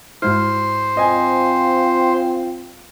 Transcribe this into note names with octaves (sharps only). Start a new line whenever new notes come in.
G#2 G#3 E4 C5 F6
C4 F4 D#5 G#5